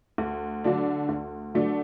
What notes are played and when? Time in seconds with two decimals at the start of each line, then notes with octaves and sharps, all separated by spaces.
0.18 D2
0.64 D3 F#3 A3 D4
1.09 D2
1.54 D3 F#3 A3 D4